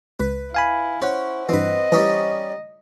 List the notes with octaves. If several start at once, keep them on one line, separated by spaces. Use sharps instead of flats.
C#2 B4
E4 F5 G#5 B5
C#4 C5 F#5
G2 E3 C4 B4 D#5
E3 G3 C#4 D#4